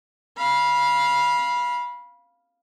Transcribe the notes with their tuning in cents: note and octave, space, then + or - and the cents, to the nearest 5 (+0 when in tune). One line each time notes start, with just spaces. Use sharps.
F5 +0 B5 -20